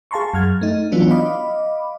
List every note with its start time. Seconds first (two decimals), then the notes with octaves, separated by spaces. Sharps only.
0.11 G#4 F5 A5 A#5 C6 C#6
0.34 F#2 F6 G#6
0.61 A3 D#4
0.92 E3 F#3 B3 C#4 D4 F4
1.10 D#5 F5 B5 D6